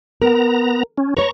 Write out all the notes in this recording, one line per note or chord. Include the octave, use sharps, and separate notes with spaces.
B3 A#4 A#5
C#4
B4 C#5 A#5 C#6